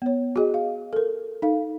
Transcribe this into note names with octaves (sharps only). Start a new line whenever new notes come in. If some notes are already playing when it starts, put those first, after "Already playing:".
B3 C#5
F#4 G#4 D#5
F5
A4 A#4
D#4 A4 F5